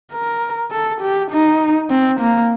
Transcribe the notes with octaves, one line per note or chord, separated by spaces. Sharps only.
A#4
A4
G4
D#4
C4
A#3